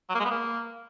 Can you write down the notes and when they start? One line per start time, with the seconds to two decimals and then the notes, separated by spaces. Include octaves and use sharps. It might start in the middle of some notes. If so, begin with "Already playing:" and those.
0.09 F#3
0.15 A#3
0.20 G#3
0.25 B3
0.30 A#3